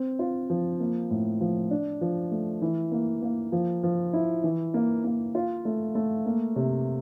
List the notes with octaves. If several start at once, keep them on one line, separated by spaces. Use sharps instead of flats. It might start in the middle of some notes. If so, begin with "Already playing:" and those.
Already playing: C4
F4
F3
A#3
A2
F3
D4
F3
A3
E3
A#3
A#3
F3
F3
E4
E3
A#3
A#3
F4
A3
A3
A#3
C3